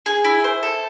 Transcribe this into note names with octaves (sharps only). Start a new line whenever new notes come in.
G#4
E4
C5
A4